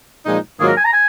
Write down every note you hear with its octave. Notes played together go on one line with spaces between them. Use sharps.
A#2 F3 G#3 D#4
G#2 D#3 F#3 A#3 F4 G#4
A#4
G#5
A#5
G#5